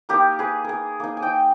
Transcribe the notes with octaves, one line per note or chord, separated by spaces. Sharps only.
A#3 D#4 G4 A#4
G#4 B4
G#4 A#4
A#3 D#4
G#5
D#5 G5